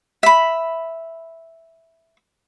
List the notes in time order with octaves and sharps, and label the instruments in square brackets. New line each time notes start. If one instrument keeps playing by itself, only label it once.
[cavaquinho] E5 B5